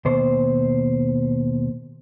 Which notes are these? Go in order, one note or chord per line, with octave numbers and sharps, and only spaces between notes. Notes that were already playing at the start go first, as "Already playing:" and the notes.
D#2 B2 C5